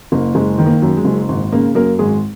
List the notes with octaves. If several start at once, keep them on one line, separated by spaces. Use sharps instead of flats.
F#1 A#3
F#1 G#3
D#3
A#3
F#2
G#3
F#1
G#1
C#3 A#3
F#2 A#3 A#4
G#1 G#3 G#4